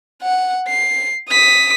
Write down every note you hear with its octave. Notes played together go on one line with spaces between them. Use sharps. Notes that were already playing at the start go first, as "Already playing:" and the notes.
F#5
C7
D#6 B6